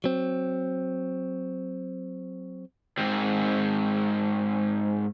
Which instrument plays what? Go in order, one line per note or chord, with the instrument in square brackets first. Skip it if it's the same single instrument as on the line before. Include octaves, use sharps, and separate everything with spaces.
[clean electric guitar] F#3 C4
[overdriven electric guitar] G#2 C4